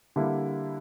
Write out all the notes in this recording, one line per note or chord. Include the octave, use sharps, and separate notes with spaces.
D3 G3 A#3 E4